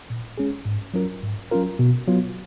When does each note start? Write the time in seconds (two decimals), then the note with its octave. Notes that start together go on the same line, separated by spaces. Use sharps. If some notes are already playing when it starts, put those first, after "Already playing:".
0.10 A#2
0.38 G#3 C#4 G#4
0.65 G#2
0.94 F#3 C#4 F4 A#4
1.23 G#2
1.51 F#3 C#4 F4 A#4
1.79 B2
2.07 F#3 B3 F4